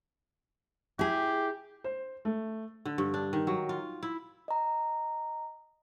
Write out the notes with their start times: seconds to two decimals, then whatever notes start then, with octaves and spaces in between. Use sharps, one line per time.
0.99 E4 G4 G#4
1.84 C5
2.25 A3
2.85 D3
2.98 G2
3.14 D4
3.33 D#3
3.47 F#3
3.69 F4
4.03 E4
4.48 D#5 A#5